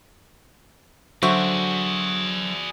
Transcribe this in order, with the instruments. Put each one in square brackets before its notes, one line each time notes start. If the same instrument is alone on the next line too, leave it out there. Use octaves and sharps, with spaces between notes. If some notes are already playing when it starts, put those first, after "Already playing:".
[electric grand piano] D3 C5 E5 [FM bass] F#3 [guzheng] F#4 [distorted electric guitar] G#4 D5